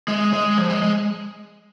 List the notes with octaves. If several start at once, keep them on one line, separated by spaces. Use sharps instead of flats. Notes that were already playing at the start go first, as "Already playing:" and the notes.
G#3
G#3
F3
G#3
G#3